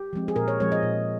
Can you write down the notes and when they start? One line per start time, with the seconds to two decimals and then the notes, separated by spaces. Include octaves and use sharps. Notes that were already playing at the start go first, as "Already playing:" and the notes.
Already playing: G4
0.13 F3 G#3 C4
0.28 G#4
0.36 A#2 A#4
0.48 C#5
0.60 F3 G#3 C4 C#5
0.72 D#5
0.83 A#2